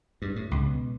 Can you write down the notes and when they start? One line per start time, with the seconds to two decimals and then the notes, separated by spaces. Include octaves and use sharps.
0.22 G2
0.36 A2
0.51 C#2
0.67 B2